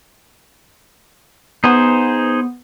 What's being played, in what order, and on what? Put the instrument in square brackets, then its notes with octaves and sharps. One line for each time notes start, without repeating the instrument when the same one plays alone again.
[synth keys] B3 [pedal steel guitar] D#4 G#4 C5